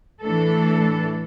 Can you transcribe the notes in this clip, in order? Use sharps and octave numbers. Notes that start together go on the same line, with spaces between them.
A2 E3 A3 D4 A4